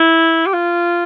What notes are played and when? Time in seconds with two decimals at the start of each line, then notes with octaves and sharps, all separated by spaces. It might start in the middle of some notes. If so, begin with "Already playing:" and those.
Already playing: E4
0.46 G4
0.53 F4